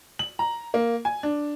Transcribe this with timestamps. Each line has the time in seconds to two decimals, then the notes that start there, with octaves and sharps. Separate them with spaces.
0.19 F#7
0.39 A#5
0.74 A#3
1.05 G#5
1.23 D4